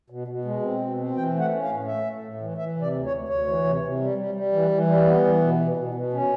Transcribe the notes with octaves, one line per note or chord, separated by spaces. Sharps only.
B2
B2
G#3
C4
B2
C4
E3 G5
A3
F#5
C#4
F5
A2
A3 E5
A3
A2
E3
E3 E5
C3
D5
D2
C#5
D2
D2 C#5
E3
C3
C3
G3
G3
G3
E3
E3
G3
B3
E3
B2
B2
B2
B2
C#4